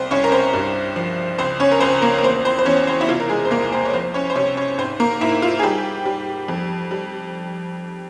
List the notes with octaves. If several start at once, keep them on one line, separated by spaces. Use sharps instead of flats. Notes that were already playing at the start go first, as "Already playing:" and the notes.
Already playing: C2 C4 C5
C2 C#4 C#5
A#4
C4 C5
G2
F3
C#2 C4 C5
C#4 C#5
A#4
C#2 C4 C5
A#3 A#4
A#4
E2 C4 C5
C4 C5
C5
E2 C#4 C#5
C4 C5
E4
C3 F4
A#4
G#3 G#4
C5
C2 A#3 A#4
C4 C5
C#5
F3 C4 C5
C#4 C#5
C5
C3 C#4 C#5
C#4 C#5
G#2 C4 C5
A#3 A#4
G#2 E4
F4
G#4
G3 G4
G3
F2
G3